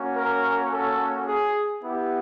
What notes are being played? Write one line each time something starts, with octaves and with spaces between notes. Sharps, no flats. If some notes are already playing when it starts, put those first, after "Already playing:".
Already playing: A#3 C#4 F#4
A#4
A4
G#4
B3 E4 G4